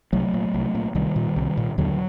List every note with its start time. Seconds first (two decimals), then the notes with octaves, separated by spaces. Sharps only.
0.13 C2 F#3 A3
0.34 A#2
0.54 C2
0.75 A#2
0.95 C2 D#3 G3
1.16 A#2
1.36 C2
1.57 A#2
1.78 D#2 D3 F#3